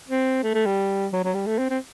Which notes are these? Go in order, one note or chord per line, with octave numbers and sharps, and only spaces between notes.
C4
A3
A3
G3
F#3
F#3
G3
A3
C4
C4